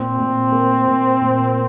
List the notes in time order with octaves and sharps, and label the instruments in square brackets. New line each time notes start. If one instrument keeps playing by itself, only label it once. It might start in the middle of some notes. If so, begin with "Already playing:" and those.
Already playing: [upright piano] A#2 [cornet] C4
[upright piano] A#2
A#3
A#2
A#2